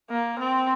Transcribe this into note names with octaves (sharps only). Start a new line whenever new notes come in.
A#3
C4